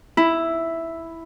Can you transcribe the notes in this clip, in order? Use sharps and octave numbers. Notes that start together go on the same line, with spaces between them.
E4